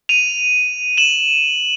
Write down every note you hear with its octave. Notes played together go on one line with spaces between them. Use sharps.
D#7 F7
E7 F#7